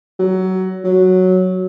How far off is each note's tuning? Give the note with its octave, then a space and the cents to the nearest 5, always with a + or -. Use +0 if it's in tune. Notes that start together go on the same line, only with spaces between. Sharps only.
F#3 +20
F#3 +0